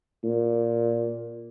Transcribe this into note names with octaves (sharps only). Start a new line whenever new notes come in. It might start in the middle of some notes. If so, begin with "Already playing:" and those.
A#2